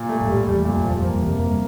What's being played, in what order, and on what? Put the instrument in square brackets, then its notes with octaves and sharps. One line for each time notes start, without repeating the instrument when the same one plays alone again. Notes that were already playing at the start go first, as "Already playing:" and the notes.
Already playing: [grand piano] A#2
A3
[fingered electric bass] G2
[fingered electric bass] A2 [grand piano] G3
[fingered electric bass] E2 [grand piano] G3
[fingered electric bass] F2 [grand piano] A#2
[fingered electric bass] E2
[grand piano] F3
[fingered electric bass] F2
[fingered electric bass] G2 [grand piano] A#3
[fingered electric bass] E2
[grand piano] C3
[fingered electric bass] F2
[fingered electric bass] G2 [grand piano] A#3